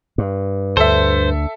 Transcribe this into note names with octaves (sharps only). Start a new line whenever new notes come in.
G2
D2 A4 C5 E5